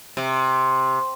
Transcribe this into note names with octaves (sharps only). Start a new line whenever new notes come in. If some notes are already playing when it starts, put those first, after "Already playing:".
C3